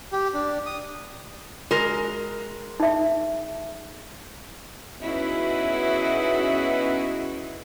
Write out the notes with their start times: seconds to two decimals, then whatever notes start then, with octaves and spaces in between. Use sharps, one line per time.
0.12 G4
0.34 D4
0.66 D#6
1.71 G#3 F#4 A#4
2.80 D#4 E5
5.00 B3 C#4 D#4 E4 F#4 G#4